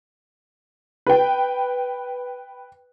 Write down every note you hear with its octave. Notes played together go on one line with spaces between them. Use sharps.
B4 G5